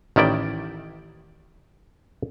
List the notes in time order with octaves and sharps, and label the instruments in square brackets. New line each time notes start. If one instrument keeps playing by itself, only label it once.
[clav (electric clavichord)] A1 D#3 E4 D5 G5